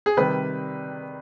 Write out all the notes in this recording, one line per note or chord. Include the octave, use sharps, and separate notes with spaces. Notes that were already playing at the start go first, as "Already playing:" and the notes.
G#4
C3 D#3 G3 B4